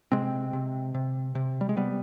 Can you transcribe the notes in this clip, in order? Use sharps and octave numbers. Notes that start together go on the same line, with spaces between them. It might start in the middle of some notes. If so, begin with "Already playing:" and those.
C3 G#3 C4
C3
C3
C3
G3
G#3
C3 G3 B3